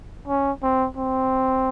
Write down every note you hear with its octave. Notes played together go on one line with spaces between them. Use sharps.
C#4
C4
C4